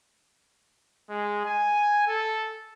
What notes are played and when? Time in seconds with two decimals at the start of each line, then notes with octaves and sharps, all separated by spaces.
1.09 G#3
1.46 G#5
2.07 A4